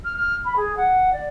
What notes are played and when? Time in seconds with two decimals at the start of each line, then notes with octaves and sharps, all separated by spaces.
0.04 F6
0.16 F6
0.45 B5
0.56 G#4
0.76 F#5
1.12 D5